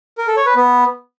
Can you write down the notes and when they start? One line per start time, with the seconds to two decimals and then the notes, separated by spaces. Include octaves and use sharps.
0.18 A#4
0.27 A4
0.37 C#5
0.46 B4
0.56 B3